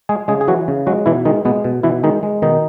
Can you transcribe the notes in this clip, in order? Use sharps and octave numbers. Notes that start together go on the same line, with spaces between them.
G#3 G#4
C#3 G#3 G#4
G#4
E3 F#3 F#4
C#3
F#3 G#3 F#4
B2 E3 E4
D#3 G#3 D#4
B2 G#3 B3
B2
B2 E3 E4
D#3 G#3 D#4
G#3
B2 D#3 D#4